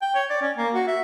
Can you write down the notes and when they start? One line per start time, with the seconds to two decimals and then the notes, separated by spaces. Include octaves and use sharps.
0.02 G5
0.15 C#5
0.30 D5
0.42 C#4
0.57 A#3
0.74 F#4
0.87 E5